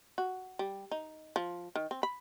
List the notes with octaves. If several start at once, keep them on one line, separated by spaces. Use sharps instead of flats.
F#4
G3
D#4
F3
D#3
C4
B5